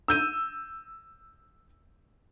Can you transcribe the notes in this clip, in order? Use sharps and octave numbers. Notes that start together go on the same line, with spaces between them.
E6 G6 D#7